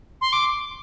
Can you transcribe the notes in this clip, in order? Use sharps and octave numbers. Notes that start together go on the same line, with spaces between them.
C6
D6